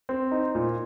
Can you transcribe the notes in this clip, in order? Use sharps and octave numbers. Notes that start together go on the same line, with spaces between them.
C4
D#4
A#2